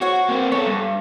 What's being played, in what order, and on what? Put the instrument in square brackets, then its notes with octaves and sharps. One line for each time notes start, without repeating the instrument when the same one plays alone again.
[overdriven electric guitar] F#4 [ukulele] C5 C#5 F#5
[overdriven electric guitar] A#3 C4
[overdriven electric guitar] B3 A4 [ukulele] C#5
[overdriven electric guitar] G2